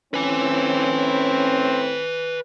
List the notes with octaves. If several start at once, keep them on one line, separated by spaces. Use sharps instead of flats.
A2 C4 C#4 B4 G#5